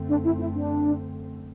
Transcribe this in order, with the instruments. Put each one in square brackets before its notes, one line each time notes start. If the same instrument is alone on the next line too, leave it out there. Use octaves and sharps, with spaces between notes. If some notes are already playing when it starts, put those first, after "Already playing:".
Already playing: [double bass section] F#2 D3 A3 C4
[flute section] D4
E4
E4
D4